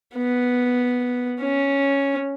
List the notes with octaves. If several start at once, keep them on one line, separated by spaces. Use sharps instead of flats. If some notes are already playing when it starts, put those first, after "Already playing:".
B3
C#4